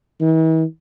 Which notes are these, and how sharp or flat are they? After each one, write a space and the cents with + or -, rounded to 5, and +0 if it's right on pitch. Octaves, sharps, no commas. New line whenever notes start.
E3 -45